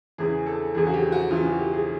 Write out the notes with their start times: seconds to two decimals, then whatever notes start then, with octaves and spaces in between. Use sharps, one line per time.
0.18 E2 C#3 E3 G#4
0.46 A4
0.75 E2 C#3 E3 G#4
0.87 F#4
0.94 G4
1.12 F#4
1.31 E2 C#3 E3 F4
1.45 F#4
1.59 G4
1.73 G#4